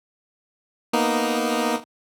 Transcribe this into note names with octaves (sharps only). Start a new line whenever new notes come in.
A#3 B3 D#4